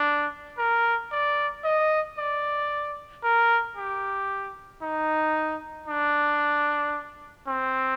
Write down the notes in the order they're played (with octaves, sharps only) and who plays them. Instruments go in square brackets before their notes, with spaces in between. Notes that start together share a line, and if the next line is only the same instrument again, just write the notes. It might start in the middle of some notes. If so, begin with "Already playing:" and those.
Already playing: [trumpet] D4
A#4
D5
D#5
D5
A#4
G4
D#4
D4
C4